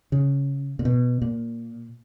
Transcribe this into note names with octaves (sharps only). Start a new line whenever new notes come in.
C#3
A#2
B2
A#2